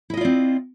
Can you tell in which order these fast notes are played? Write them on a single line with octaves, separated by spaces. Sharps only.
E4 D#5 F4 D5 C4